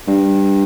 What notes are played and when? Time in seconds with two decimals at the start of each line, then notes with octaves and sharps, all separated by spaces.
0.07 G2